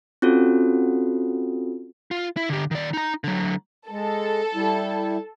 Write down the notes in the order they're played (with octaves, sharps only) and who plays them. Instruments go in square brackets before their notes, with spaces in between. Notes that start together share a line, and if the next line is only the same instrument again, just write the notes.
[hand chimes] C4 C#4 F4 F#4 A4
[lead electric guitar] F4
E4
D3 G4
D#3 D5
D#4 A#5
D3 F#3
[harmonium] G#3 [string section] A4
[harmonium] G3 E4